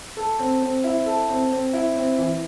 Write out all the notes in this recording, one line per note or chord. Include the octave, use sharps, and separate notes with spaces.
A4
C4
C4
E4
A4
C4
C4
E4
C4
E3